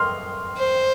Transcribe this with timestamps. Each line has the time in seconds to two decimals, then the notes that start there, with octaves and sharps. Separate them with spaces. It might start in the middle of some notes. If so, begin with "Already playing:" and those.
Already playing: C6 F6
0.57 C5